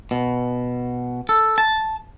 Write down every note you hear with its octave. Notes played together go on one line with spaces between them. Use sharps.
B2
A4
A5